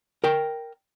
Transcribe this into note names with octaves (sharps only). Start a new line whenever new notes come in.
A#4 G5